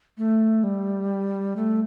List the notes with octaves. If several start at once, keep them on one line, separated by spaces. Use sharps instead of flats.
A3
G3
A3